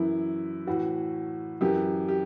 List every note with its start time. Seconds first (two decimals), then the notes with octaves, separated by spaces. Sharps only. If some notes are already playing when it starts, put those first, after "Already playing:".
Already playing: F#2 E3 E4
0.67 A2 E3 F#4
1.61 F#2 E3 G4
2.08 G4